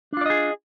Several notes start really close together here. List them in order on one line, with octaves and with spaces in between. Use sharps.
D4 F4 D5 D#5 G#4